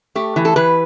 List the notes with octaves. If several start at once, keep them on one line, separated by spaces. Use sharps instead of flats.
A3 G4
E3
A4
E3 B4